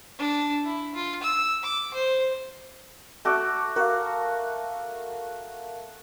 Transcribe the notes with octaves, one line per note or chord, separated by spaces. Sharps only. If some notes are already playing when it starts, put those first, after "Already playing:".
D4
E4
F4
E6
D6
C5
A3 F#4 D6
F#4 A#4 F5